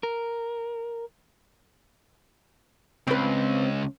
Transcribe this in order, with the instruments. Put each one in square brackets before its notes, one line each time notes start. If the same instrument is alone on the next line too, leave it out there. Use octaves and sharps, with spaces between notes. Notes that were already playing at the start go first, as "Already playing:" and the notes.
[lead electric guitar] A#4
[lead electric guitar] C#2 [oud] C4 B4